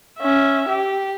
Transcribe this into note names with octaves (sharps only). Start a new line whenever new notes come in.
C#4 E5
G4